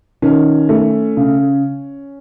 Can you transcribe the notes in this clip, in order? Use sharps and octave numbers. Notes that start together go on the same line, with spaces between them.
D#3 C#4
A3
C#3